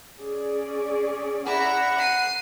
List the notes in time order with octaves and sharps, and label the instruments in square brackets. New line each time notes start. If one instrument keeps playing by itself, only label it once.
[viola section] C#4 G#4 D5
[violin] E4 A#5 [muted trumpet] F#5
[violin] C7 D#7